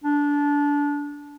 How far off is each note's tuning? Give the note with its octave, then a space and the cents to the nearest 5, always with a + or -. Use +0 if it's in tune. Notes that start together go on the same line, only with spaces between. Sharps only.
D4 -20